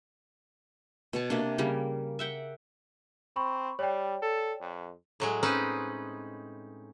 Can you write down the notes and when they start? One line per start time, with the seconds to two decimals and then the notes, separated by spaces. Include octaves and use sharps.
1.13 B2 C#5 A5
1.30 C3 A#3 D4
1.58 C#3 G3 A#3
2.19 E5 F#5 G5
3.36 C4 B5 C#6
3.79 G3 C#5 D5 G5
4.22 A4
4.61 F2
5.20 A2 F#3 G#3
5.43 C4 C#4 D#4 B4